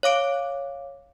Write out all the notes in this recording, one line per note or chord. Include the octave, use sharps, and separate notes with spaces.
C#5 F5 D6 D7